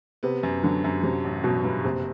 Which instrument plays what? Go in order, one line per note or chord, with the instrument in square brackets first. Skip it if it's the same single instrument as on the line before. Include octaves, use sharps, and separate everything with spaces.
[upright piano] C3 [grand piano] B3
[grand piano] F#2
[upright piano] D3 [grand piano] F#3
[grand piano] F#2
[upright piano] C3 [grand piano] F#3
[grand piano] A1
[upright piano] B2 [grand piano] F#3
[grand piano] G2
[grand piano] F#1 [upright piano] C3